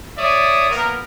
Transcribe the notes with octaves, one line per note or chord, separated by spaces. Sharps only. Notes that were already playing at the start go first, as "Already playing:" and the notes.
C#5 D5 E5 D#6
A#3 B3 A#4